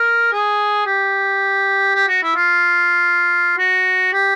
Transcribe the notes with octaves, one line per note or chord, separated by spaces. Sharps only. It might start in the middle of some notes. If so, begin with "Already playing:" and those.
Already playing: A#4
G#4
G4
G4
F#4
E4
F4
F#4
G4